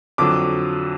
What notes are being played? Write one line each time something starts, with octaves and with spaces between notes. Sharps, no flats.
F2 D3 F#3 D6